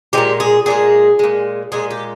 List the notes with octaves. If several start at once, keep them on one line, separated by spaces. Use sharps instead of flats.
A#2 F3 G#3 G4
G#4
A#2 F3 G#3 G#4
A#2 G#3
A#2 G#3 G#4
G4